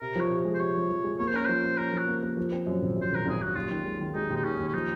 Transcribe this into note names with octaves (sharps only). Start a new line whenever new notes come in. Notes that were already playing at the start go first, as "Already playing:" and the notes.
C3 A#4
F3 C#5
C3
G#3
C5
C3 C#5
F3
F3
G#3
A#3 C#5
C5
C#4 A#4
F3 C5
A#3
C#4 A#4
F3
F#4
A#3
A#3
F3
C4
F#2
G#1
F#2 C5
G#1 A#4
G#1 G#4
F#2 F#4
D#2 F4
D#3
G#3
D#3
G#3 D#4
D#2
D#4
D#3 C#4
D#2
C#4
F3 D#4